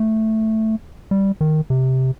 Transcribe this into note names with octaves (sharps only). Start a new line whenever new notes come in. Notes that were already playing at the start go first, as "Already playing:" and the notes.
Already playing: A3
G3
D#3
C3